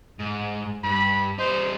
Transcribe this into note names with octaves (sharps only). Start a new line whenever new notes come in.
G#2
G2 B5
G3 D#4 C5